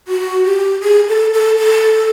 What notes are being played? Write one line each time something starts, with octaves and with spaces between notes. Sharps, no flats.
F#4
G4
G#4
A4
A4
A4